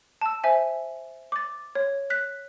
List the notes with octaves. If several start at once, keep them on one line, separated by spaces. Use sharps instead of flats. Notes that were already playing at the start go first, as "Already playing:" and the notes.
A5 E6
C5 E5 G#5
D6 A6
C#5
F#6 B6